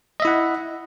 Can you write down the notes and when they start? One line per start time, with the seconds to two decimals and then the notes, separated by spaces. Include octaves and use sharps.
0.20 D#5
0.22 E5
0.25 E4
0.27 F#5